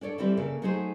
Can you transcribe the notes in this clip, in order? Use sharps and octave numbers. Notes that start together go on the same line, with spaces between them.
D4 A4 C#5 D5
E3 G3 C4 E4 A4
C#3 A#3 A4
F#3 A3 D#4 G#4 C5